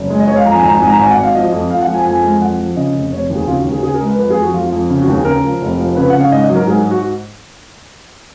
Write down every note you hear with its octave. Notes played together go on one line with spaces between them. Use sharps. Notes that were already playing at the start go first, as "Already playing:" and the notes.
Already playing: F#1
G#3
D#5
G#3 C#5
F5
F2 A#5
G#5
G#1 A#5
G#5
G#2
A#5
G#1 G#5
F#5
G#1
F5
F3 D#5
F2
F2 F5
F#5
F3
G#5
F2 G#5
G#3
F2 F#5
F3
C#3 D#5
F1
F1 C#5
D#2
G#4
C#3 F4
F#4
D#2
G#4
C#3 G#4
A#4
G#3
B4
F2 B4
G#4
F2
F#4
F2 F4
F4
F2
C#3
F#4
D#2
G#4
C#3 A#4
F3
F1
F3
C#3 B4
C#3 F#5
F5
G#2 D#5
D#5
F#3
A#4
G#2 G#4
F#4